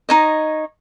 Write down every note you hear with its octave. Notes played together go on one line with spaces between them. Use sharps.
D#4 C#5 D#5